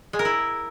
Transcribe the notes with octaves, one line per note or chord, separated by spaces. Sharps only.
G#3
A#4
E4